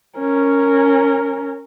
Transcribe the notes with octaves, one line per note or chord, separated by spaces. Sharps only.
C#4 A#4